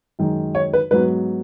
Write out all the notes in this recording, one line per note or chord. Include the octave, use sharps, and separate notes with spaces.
F#2 D#3 G#3
C#5
B4
G#2 F#3 B3 B4